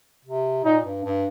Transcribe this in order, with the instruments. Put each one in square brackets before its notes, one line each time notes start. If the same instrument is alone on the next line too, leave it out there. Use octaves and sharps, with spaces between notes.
[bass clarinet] C3
[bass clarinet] A#2 [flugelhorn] D#4
[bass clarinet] G2
G2